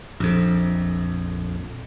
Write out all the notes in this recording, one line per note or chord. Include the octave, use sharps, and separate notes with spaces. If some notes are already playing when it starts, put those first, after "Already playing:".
A#1 F2